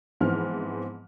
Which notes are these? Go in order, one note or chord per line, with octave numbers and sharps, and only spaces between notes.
G#2 E3 F3 B3 C4 F6